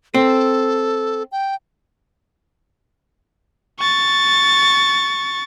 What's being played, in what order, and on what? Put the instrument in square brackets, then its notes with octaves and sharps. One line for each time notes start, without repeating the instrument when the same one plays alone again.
[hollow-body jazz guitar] C4 [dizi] A4
[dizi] G5
[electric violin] C#6 A6